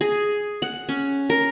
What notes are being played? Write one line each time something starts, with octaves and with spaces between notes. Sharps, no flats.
G#4
F#5
C#4
A#4